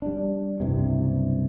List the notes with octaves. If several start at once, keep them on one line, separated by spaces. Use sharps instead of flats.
G3 D4
F#1 C2 G2 C3